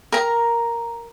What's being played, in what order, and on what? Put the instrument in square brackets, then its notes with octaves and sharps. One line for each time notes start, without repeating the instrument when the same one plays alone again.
[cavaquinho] A#4 A#5